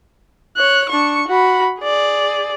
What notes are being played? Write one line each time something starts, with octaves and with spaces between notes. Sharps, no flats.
C#5 F#6
D4 C#6
F#4 B5
G#4 D5